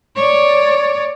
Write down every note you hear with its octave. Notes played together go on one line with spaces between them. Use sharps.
C#5 D5